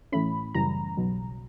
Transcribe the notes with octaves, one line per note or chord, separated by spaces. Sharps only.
A2 E3 A3 C#4 B5
F#2 C#3 E3 G3 A#5
B1 B2 F#3